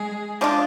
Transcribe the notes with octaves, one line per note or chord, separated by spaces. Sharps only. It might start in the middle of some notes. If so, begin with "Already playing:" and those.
Already playing: G#3 G#4
F3 G#3 D4 F4